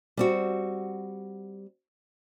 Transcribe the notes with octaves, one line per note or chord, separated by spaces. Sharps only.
G3 C4 F#4